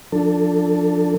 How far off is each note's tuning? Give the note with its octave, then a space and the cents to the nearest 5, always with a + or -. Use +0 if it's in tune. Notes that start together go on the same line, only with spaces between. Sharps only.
F3 +5 D4 +0 A4 +20